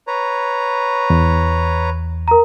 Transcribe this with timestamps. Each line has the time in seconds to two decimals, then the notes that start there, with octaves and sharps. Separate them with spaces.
0.07 B4 C#5 A#5
1.10 E2
2.28 A#4 A#5